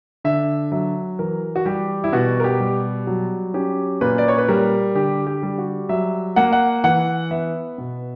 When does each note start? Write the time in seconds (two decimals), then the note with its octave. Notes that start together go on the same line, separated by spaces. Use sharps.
0.24 D3 E5
0.72 F#3 E5
1.19 E3 A#4
1.56 F#4
1.66 G3 G4
2.04 E4
2.13 B2 F#4
2.40 A#4
2.44 G4
2.60 G3
3.07 F#3 F#4
3.54 C#4 G4
4.01 A#2 B4
4.18 D5
4.28 C#5
4.38 B4
4.48 G3 A#4
4.95 D3 G4
5.27 G4
5.43 G3
5.58 F#4
5.89 F#3 E5
6.36 A#3 F#5
6.53 F#5
6.84 E3 F#5
7.31 B3 E5
7.78 B2